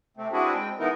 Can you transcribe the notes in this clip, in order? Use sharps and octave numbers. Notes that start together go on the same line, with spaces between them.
C3 A3 C4
C4 D4 E4 F#4 G#4 B4
G#3 C4 G5
E3 G#3 B3 D#4 E4 A#4